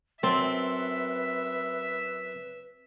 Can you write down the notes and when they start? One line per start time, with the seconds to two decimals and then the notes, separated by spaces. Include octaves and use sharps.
0.23 F#2 C4 B4 E5 A5 C6